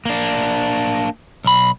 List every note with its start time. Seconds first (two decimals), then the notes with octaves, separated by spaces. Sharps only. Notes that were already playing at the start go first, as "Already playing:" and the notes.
0.06 A#3 D4
1.44 B1 B5